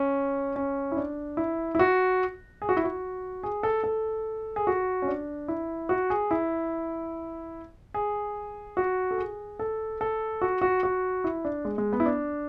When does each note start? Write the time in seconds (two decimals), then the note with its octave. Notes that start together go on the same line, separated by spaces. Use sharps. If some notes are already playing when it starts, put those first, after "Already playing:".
Already playing: C#4
0.56 C#4
0.92 E4
0.97 D4
1.37 E4
1.75 E4
1.79 F#4
2.62 G#4
2.69 F#4
2.77 E4
2.84 F#4
3.43 G#4
3.63 A4
3.84 A4
4.56 G#4
4.67 F#4
5.02 C#4
5.08 D4
5.48 E4
5.89 F#4
6.10 G#4
6.31 E4
7.94 G#4
8.77 F#4
9.11 A4
9.18 G#4
9.59 A4
10.01 A4
10.41 F#4
10.61 F#4
10.83 F#4
11.24 E4
11.45 D4
11.65 G#3
11.78 G#3
11.93 B3
12.00 E4
12.06 D4